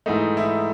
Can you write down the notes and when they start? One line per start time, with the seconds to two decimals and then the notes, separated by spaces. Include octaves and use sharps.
0.06 G#2 E3 A3 D#4
0.37 E4